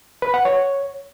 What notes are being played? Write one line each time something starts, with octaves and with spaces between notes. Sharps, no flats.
B4
F#5
C#5